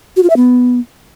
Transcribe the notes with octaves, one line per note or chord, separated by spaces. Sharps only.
F#4
F4
E5
B3